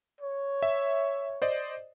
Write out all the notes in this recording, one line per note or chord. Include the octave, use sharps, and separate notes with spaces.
C#5
E5
C5 D5 D#5